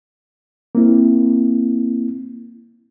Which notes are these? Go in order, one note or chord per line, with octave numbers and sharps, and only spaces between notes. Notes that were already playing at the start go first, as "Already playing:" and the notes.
A#3 C4 E4